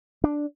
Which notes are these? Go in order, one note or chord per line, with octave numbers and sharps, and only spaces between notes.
D4